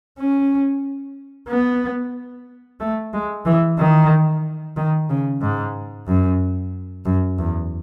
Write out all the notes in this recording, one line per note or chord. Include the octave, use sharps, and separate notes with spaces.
C#4
B3
A3
G#3
E3
D#3
D#3
C#3
G#2
F#2
F#2
E2